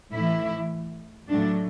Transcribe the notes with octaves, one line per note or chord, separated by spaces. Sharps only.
A2 E3 E4
A2 F#3 D4